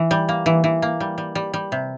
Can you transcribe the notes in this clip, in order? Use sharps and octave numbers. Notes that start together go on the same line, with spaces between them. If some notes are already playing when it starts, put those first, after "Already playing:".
Already playing: E3
G3
A#3
E3
E3
A#3
G3
G3
G3
G3
C3